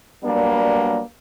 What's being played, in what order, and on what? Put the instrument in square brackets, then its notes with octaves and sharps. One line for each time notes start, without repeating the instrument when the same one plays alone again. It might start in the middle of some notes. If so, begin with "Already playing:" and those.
[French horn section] F#3 G3 A#3 B3 D4 A#4